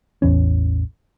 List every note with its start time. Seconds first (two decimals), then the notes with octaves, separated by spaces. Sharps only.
0.22 A1 E2 E3 C#4